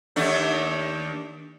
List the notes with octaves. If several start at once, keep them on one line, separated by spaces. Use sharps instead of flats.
D#2 A3 D4